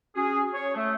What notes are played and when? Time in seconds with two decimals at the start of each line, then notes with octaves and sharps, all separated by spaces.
0.14 C#4 F#4 G#4
0.54 C#5
0.74 A3